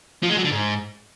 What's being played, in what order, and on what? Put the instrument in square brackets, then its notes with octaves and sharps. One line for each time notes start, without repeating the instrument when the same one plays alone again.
[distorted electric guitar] F3
G#3
F#3
D3
G#2